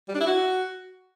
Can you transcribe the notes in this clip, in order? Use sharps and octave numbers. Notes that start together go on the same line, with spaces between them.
G3
D4
E4
F#4